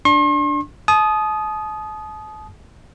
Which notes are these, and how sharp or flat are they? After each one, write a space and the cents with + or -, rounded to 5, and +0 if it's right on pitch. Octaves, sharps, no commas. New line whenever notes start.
D4 +0 C6 +45
A5 -40 D#6 +0